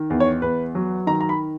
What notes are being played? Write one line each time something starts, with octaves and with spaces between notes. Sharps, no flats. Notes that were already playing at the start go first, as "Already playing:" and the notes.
Already playing: D#3
E2
C#5
E2 B4
F#3
D#3 A#5
A#5
B5